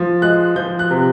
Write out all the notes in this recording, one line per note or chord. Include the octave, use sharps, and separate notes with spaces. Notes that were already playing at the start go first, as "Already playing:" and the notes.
Already playing: F3
G#3 F#6
F3 G6
F#6
C3